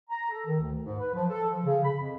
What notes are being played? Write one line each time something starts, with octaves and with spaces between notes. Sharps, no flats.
A#5
A4
D#3
D2
G#2
B4
F3
A4
F3
C#3
B5
F2